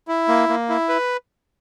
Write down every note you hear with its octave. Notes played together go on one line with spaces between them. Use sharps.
E4
A#3
A#3
E4
B4